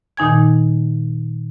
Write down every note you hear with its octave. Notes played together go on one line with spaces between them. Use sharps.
A#2 D#3 D#4 G#5 G#6